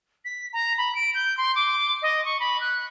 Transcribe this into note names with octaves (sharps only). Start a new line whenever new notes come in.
B6
A#5
B5
D7
G6
C6
D6
D#5
C#6
B5
F#6